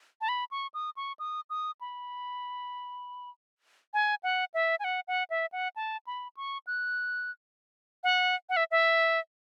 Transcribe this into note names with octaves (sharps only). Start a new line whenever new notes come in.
A5
B5
C#6
D#6
C#6
D#6
D#6
B5
G#5
F#5
E5
G#5
F#5
F#5
E5
F#5
A5
B5
C#6
F#6
F#5
F#5
E5
E5